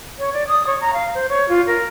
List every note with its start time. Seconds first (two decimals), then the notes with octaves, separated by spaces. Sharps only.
0.19 C#5
0.33 D5
0.48 D#6
0.67 C#5
0.81 A#5
0.93 F5
1.14 C5
1.29 C#5
1.49 F4
1.67 A#4